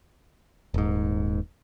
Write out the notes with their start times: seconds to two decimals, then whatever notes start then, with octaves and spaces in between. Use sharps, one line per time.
0.74 D#1 G#2